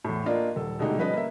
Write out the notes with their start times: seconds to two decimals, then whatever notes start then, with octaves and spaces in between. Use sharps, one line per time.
0.05 E2 A2
0.26 A#3 D4 F4 D5 D#5
0.56 D#1 A4
0.79 B2 D3 G#3 A3 D#4 G4
0.97 F3 G3 C#4 B4 C#5 D#5
1.14 A#3 E5